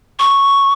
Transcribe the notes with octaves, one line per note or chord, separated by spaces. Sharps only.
C#6